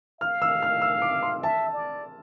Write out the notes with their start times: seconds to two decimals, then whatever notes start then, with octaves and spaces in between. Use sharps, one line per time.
0.21 F5 F6
0.42 E6
0.63 F6
0.82 E6
1.02 D6
1.23 C6
1.43 E5 A5
1.73 D5